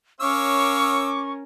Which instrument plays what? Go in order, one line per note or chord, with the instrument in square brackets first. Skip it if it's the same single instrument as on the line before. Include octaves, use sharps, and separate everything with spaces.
[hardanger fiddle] C#4 A#4 [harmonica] C#5 F5 E6 [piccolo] C#6 [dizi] D6